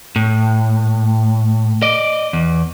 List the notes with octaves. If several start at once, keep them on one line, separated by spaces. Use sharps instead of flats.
A2
D5 D#5
E2